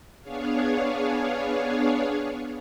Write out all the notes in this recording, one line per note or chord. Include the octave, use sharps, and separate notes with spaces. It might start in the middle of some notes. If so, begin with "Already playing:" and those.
B3 D4 G#4 C#5 F5